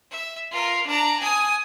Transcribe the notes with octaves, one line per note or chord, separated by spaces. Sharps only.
E5
F4 A#4
D4 A#5
G#5 D#6